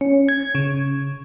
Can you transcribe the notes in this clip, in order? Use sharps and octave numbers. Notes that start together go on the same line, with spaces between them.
C#4
G#6
C#3